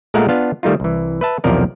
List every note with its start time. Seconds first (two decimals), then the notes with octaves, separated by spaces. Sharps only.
0.14 A#2 G#3 A3 A#4 F5 F#5
0.29 B3 D4 F4 F5
0.63 D#3 G3 A3 D#4 F4
0.80 C2 E3
1.21 B4 E5 A5
1.44 B1 E2 C3 F3 A#4 D5